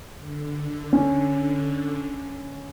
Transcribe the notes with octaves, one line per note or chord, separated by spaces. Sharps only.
D3
C#4